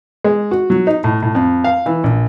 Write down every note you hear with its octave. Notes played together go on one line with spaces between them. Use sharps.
G#3
F#4
F#3
D#4
A2
A2
F2
F5
E3
A#1